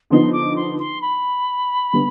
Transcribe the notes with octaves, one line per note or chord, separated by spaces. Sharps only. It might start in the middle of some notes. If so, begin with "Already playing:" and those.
D3 F3 B3 D#4 C6
D6
C6
C6
B5
D3 G3 B3